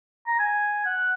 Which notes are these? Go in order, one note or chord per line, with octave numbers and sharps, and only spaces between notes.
A#5
G#5
F#5